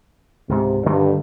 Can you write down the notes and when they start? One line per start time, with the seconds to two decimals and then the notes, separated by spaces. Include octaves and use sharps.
0.49 C#2 G#2 C3
0.86 G2 D3 D#3 A3